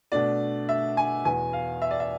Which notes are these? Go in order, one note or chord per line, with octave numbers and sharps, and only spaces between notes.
B2 A3 D4 D5
E5
G#5
E2 B2 B3 G#5
F5
E5
D5
E5